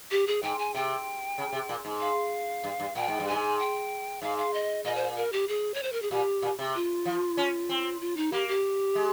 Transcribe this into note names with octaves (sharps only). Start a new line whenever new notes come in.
G4
G#4
G#2 G5
G#5
C3 G5
C#3
C3
A#2
G#2
F5
G2
G2
A#2 G5
G#2
G2
G#2 G#5
G5
G#2 F5
F5
D#5
A#2 D#5
C5
A#4
G4
G#4
C#5
C5
A#4
G#4
A#2 G4
A#2
C3
F4
F3
C#4
C4
F4
D#4
A#3 G4
G4
G#3